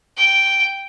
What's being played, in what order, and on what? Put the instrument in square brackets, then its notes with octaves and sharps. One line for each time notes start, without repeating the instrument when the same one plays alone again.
[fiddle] G5